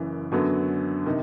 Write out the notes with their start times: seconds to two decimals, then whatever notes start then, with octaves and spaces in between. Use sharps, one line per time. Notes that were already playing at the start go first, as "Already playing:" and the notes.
Already playing: F#1 F#2 C#3 E3
0.32 F#2 D3 F#3 B3
1.06 C3 D#3